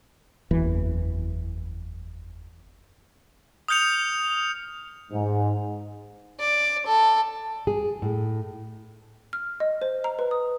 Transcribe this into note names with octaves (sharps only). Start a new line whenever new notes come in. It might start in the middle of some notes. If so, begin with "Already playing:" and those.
F#1 E2 E3
D#6 F6 G6 C#7 F7
G#2
D5
A4
G#4
A2
F6
D#5
C5
A#5
B4
D#6